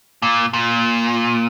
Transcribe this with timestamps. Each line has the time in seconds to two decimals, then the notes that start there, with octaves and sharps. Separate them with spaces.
0.22 A#2
0.53 A#2